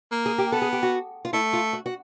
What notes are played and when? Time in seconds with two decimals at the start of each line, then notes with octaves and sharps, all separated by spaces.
0.12 A#3
0.26 G#4
0.38 G4
0.52 B3 A4
0.62 G#4
0.73 G4
0.83 F#4
1.25 F4
1.33 A3 E4
1.53 F4
1.73 F#4
1.86 F#4